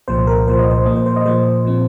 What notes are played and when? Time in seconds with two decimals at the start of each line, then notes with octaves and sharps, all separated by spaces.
0.08 C2 A#2 F3 C5
0.27 A#4
0.47 C2 A#2 F3 C5
0.59 D#5
0.71 C5
0.86 A#2 F3 A#3 D#5
0.96 C5
1.06 C5
1.16 D#5
1.26 A#2 F3 A#3 C5
1.65 A#2 F3 C4